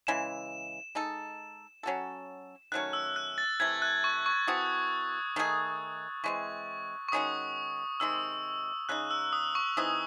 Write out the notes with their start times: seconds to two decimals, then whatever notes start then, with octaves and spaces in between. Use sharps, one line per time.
0.07 C#3 E3 G#3 E7
0.95 G#3 D#4 A4
1.83 F#3 C#4 F#4 A4
2.72 D#3 F#3 A3 C#4 F#6
2.93 E6
3.16 F#6
3.38 A6
3.60 C3 E3 A3 G#6
3.82 F#6
4.04 C#6
4.26 C#6
4.47 E3 C4 F#4 A4 D#6
5.36 D#3 A3 D#4 G#4
6.24 E3 G#3 C4 C#6
7.09 C#6
7.12 D#3 G#3 C#4 F#4 D#6
8.00 C3 D#3 G#3 C4 E6
8.89 C#3 G#3 D#4 F#6
9.11 E6
9.33 D#6
9.55 C#6
9.77 E3 C4 D#4 G#4 D#6